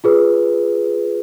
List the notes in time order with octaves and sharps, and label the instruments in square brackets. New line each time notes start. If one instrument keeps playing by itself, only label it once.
[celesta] F4 G#4 B4